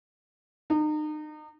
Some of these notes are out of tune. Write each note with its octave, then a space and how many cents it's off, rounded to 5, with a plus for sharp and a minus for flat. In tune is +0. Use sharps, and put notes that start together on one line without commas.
D#4 -35